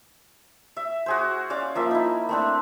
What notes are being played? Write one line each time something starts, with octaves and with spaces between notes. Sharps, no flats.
E5
F#4 G#4 C5
C#4 D5 F5 D6
F3 A#3 E5
D#4 E4
A3 C4 D4